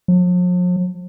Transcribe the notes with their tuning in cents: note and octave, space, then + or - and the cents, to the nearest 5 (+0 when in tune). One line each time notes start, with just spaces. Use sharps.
F3 +45